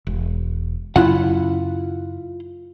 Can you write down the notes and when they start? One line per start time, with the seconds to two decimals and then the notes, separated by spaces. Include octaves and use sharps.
0.07 E1
0.96 F#2 C#3 F#3 E4 F4 F#5